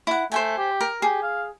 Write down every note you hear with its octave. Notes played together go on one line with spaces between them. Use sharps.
E4 F#5
A3 C5 G5 G#5
G4
A#4
G4 G#4
F5